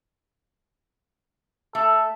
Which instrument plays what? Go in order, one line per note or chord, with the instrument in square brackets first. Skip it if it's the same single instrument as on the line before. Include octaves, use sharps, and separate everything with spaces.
[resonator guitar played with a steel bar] A3 [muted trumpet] A4